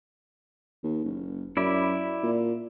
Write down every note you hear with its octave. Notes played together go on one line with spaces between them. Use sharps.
D#2
F#1
F#2 E4 D5 B5
A#2